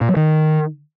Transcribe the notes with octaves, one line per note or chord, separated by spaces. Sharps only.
A#2
F#3
D#3